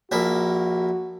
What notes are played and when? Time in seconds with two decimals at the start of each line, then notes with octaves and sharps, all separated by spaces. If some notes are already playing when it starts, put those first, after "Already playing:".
0.12 A#1 A#3 E4 F#4